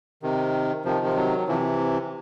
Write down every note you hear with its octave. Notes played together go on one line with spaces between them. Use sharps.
C3 D#3
C3 D#3 F3
F3
F#3
C3 E3 F3